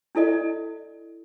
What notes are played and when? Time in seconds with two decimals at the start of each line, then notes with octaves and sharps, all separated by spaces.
0.15 D4 E4 A4 D5 D#5